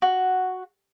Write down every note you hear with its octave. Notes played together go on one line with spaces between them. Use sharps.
F#4